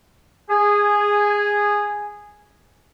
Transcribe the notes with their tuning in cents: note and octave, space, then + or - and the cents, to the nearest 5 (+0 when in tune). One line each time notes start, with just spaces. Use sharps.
G#4 -15 G#5 +0